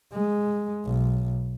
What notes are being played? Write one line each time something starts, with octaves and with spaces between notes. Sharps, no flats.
G#3
B1